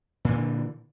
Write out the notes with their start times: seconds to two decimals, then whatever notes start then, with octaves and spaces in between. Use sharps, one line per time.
0.25 A#2
0.28 E3
0.32 D3